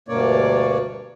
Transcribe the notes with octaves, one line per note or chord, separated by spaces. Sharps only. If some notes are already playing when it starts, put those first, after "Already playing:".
D2 G2 B2 A#3 C#5 D5